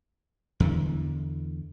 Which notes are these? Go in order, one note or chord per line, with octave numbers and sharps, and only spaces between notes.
E2 D3 E3